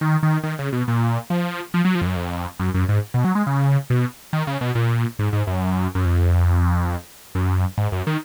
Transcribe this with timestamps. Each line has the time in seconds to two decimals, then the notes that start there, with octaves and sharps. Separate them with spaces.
0.01 D#3
0.23 D#3
0.44 D#3
0.59 C#3
0.73 B2
0.88 A#2
1.30 F3
1.74 F3
1.85 F#3
1.95 F3
2.02 F2
2.06 F#2
2.16 F2
2.59 F#2
2.74 F#2
2.89 G#2
3.14 B2
3.25 F#3
3.35 G#3
3.47 C#3
3.90 B2
4.33 D#3
4.47 C#3
4.61 B2
4.75 A#2
5.19 G#2
5.33 G#2
5.47 F#2
5.95 F#2
6.05 F2
7.35 F#2
7.78 G#2
7.92 F#2
8.07 D#3